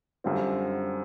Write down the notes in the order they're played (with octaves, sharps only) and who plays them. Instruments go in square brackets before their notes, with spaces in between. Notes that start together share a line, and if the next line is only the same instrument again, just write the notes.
[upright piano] F#2 D3 G3 C4 F4